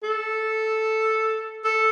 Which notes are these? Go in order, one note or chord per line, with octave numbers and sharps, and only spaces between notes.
A4
A4